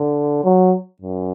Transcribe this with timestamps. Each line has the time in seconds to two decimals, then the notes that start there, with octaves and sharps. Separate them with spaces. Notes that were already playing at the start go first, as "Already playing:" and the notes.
Already playing: D3
0.44 F#3
1.02 F#2